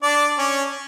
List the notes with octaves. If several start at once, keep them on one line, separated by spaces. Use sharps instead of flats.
D4 D5
C#4 C#5